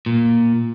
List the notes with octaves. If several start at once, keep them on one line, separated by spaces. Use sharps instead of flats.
A#2